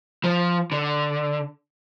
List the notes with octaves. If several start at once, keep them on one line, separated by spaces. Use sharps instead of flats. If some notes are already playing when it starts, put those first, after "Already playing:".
F3
D3